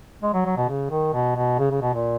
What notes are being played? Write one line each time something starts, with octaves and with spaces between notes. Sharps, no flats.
G#3
F#3
F#3
B2
C#3
D#3
B2
B2
C#3
C#3
B2
A#2